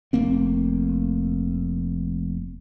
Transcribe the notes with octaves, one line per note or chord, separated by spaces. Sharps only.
F1 A3 A#3 C4